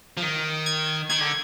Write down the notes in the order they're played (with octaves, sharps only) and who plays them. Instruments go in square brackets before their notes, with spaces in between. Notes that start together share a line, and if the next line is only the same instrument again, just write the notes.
[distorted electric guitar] F3
D#3
[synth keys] G#6
[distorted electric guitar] D#3 [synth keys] G#6
[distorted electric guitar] D3